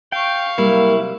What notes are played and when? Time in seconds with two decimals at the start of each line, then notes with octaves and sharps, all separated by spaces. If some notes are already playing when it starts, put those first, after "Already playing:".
0.12 F5 G5 C#6
0.58 C3 F#3 G3 A#3 E4